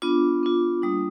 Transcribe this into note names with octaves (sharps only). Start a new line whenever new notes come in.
B3 D4 F4 D6
B3 D4 F4
G3 A#3 D4 F4 D#6